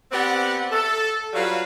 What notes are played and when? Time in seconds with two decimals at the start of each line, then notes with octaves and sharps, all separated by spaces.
0.12 B3 C4 G4 D5 F#5
0.71 A4
1.33 F#3 G3 F4 F#4 B4 F5